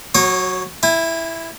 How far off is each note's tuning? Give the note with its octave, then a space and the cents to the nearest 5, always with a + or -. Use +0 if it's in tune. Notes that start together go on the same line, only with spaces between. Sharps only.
F#3 +0 C#5 -30 D#6 -25
E4 +0 G#5 -35